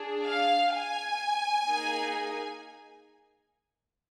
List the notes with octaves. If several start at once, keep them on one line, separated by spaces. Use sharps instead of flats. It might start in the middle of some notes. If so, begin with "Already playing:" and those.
Already playing: D4 G#4
F5
G#5
A#3 D#4 G#4